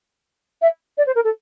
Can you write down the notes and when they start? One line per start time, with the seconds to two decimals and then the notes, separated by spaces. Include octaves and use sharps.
0.62 E5
0.97 D5
1.06 C5
1.15 A#4
1.24 A4